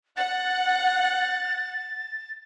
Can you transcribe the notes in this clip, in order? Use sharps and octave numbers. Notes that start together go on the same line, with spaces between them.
F#5 F#6 A6